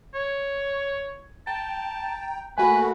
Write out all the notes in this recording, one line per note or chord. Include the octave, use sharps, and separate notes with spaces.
C#5
G5 A5 A#5
A3 A#3 F#4 B4 G#5 B5